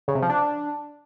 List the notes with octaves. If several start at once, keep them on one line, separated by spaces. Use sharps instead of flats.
C#3
C3
F3
D4